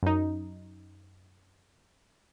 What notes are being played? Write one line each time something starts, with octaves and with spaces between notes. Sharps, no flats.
F#2 D#4